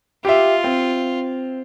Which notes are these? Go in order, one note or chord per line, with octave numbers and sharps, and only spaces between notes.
F4 G4 E5
C4